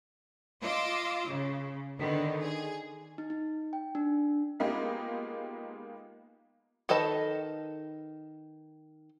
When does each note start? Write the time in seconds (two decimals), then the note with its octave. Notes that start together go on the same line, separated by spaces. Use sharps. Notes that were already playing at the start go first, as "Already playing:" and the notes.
0.62 F4 D#5 D6 E6
1.29 C#3
1.99 D3 D#3 B3
2.42 G#4
3.18 D#4
3.30 D#4
3.73 G5
3.95 D4
4.60 G#3 A#3 B3 D#4 F4 G4
6.89 D#3 A4 B4 D#5 A5